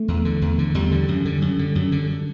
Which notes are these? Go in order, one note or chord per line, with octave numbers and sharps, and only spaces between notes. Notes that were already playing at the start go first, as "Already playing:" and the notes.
Already playing: A3
E2
D3
E2
D3
E2 G3
D3
F#2
D3
F#2
D3
F#2
D3